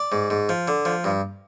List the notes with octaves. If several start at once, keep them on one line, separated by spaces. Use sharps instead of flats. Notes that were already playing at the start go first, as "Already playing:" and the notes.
Already playing: D5
G#2
G#2
F3
D3
F3
G2